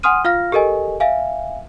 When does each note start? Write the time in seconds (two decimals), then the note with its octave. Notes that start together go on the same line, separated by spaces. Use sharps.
0.03 F#5 G#5 C6 D#6 F6 D#7
0.25 F4 F5 F6 A#6
0.52 G4 A4 A#4 D#5 G#5
1.00 E5 F5 G#5